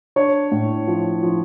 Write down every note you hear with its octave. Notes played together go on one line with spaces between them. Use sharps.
D4 C#5
A2
F3
F3